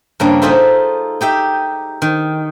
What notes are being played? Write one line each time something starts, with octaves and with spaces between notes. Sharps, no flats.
G2 C#3 A#3 D4
D#4 F4 G#4 A4 C5 E5
D#4 G4 E5
D#3